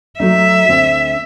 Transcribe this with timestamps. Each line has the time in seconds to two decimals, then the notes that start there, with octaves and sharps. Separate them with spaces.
0.20 F#3 A3 D#4 E5
0.69 D2 C4